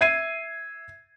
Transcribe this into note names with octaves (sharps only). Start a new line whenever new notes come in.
E5 G#6 C7 D#7